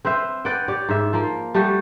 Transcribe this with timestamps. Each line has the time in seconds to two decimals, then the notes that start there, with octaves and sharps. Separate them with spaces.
0.05 C4 B4 C5 E5
0.45 B4 D5 F#5 G5
0.68 G4 C#5 D5
0.89 G#2 E5
1.13 F3 A#3
1.54 G3 A3 F#4 G4